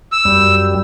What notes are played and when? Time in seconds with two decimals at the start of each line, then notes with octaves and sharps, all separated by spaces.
0.12 E6
0.25 F#2 G3